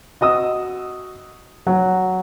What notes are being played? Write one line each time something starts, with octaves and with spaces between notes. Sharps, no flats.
F#4 D#5 D#6 E6
F#3